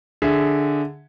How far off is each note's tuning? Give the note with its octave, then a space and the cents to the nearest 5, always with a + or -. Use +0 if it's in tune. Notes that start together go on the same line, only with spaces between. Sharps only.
D3 +0 G#4 +0 E5 -10